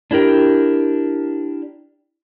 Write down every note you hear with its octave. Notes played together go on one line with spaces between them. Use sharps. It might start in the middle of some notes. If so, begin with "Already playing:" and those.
D4 E4 G4 A#4 G5